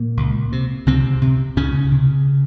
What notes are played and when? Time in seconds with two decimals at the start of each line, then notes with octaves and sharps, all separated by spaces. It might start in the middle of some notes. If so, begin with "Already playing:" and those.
Already playing: A#2 A#3
0.17 C#2
0.52 C3
0.86 C#2 C3 C4
1.22 C3
1.57 C#2 C#3 C#4
1.91 C3